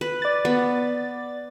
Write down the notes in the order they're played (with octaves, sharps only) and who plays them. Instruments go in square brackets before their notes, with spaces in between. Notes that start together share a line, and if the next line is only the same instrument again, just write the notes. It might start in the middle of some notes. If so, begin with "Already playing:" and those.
[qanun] B4
[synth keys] D5 A6
[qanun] B3